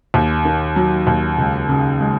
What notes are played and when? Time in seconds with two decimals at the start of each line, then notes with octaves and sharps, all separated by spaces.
0.14 D#2
0.45 D#3
0.76 F#3
1.07 D#2
1.38 C#2
1.69 C#3
2.00 G#3